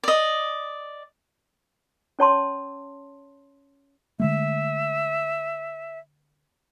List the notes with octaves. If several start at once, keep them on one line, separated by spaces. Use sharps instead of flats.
D5 D#5
C#4 C#5 A5 C6
D3 G#3 A3 E5